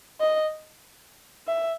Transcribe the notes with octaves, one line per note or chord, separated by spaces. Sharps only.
D#5
E5